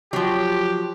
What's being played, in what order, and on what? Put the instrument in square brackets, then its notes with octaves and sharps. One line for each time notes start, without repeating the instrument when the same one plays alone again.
[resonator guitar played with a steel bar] F3 F#3 [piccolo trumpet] G4